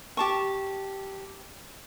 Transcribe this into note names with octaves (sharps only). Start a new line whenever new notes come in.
G4 A5 C#6